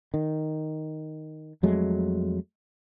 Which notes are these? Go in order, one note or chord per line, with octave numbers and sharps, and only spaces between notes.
D#3
F2 F#3 G#3 A3